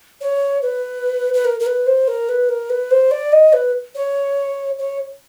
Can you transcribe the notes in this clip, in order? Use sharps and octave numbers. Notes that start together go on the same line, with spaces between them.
C#5
B4
B4
A#4
A#4
B4
C5
A#4
B4
A#4
B4
C5
D5
D#5
B4
C#5
C#5